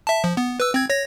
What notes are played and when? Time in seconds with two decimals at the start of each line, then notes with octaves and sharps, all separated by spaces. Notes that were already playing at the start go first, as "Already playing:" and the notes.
0.07 E5 A5
0.24 F3
0.37 B3
0.60 B4 E6
0.74 C4 G#6
0.90 C#5 A#6